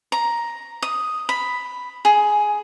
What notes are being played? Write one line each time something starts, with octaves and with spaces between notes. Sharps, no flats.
A#5
D#6
B5
G#4